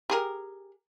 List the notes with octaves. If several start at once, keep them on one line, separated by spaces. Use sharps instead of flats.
G4 G#4 A#4